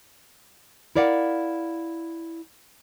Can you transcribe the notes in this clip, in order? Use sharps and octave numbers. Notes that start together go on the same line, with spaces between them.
E4 A#4 D5 F5 F#5